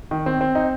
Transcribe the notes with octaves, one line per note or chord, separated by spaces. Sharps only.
D#3
C4
C4
D#4